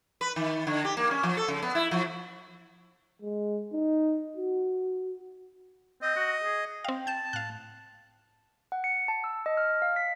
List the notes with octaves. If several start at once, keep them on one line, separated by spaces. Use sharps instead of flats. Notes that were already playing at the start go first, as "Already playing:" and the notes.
B4
D#3
D3
G4
A#3
C#4
F3
A4
C#3
B3
E4
F3
G#3
D#4
F#4
C4 D#5
F#4
G#4
C4 F5 G5
A5 G6 E7
A2 F5 F#6
F#5
C#7
A5
E6
D#5
F6
F5
B6